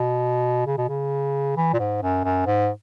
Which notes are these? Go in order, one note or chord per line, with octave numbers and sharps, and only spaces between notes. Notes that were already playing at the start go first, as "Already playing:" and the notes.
Already playing: B2
C#3
B2
C#3
E3
A#2
G#2
F#2
F#2
G#2